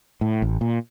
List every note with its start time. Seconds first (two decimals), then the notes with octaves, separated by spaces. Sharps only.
0.21 A2
0.42 A1
0.61 A#2